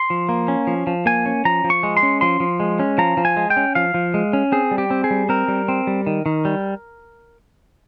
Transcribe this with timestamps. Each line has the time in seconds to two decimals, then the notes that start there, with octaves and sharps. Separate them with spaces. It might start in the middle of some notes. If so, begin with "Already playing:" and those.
Already playing: C6
0.10 F3
0.29 A#3
0.48 C#4
0.67 F3
0.87 F3
1.06 A#3 G#5
1.26 C#4
1.45 F3 A#5
1.64 F3
1.70 C#6
1.83 G#3
1.97 C6
2.03 C#4
2.21 F3 C6
2.40 F3
2.60 G#3
2.79 C#4
2.98 F3 A#5
3.17 F3
3.25 G#5
3.37 G#3
3.50 G5
3.57 C#4
3.75 F3 F5
3.94 F3
4.14 G#3
4.33 C#4
4.52 C4 G#4
4.71 G3
4.78 G4
4.90 C4
5.04 G#4
5.11 G3
5.29 C4 A#4
5.48 G3
5.68 C4
5.87 G3
6.07 D#3
6.26 D#3
6.45 G3